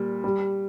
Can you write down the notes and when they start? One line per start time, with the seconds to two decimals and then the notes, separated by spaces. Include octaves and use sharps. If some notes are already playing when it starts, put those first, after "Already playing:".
Already playing: A#2 G3
0.24 G3